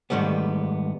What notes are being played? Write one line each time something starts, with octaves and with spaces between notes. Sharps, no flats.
G#2 D#3 G3 A3 B3